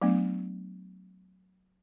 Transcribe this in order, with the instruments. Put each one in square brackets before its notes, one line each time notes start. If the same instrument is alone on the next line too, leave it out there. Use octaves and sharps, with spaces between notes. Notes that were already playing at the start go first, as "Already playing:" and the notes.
[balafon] F#3 A3 B3 D4